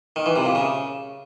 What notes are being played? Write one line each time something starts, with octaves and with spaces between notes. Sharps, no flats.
D#3
E3
C3
A#2
C#3